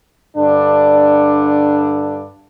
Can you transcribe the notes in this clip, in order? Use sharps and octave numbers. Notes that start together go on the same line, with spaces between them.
G2 D3 D4